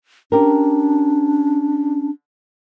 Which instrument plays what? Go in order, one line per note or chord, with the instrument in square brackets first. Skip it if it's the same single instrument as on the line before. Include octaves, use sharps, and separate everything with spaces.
[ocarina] C#4 [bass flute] D4 [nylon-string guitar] G4 A#4